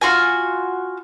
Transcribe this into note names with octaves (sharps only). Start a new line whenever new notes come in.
F4 F#4 G#5